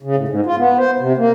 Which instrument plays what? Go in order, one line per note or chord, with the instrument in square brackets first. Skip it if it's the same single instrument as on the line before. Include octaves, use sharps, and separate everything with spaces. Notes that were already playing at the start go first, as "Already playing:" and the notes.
[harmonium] C#3
A2
G#2
F4
B3
C5
C3
A#3